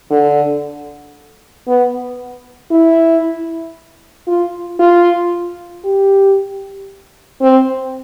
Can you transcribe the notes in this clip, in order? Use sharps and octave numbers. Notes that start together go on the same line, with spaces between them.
D3
B3
E4
F4
F4
G4
C4